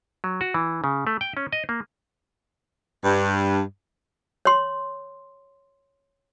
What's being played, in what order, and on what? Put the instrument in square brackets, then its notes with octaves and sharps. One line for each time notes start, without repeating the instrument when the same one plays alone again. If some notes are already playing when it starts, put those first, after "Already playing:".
[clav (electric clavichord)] F#3
F#4
E3
C#3
A3
G5
C#4
D#5
A#3
[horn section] G2
[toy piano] C#5 C6